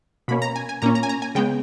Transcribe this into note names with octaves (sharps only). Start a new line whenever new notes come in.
B2 A#3 C#4 B5
A#5
G#5
G#5
A#2 A#3 C#4 A#5
A#5
G#5
A#5
G#5
C#3 G#3 B3 G5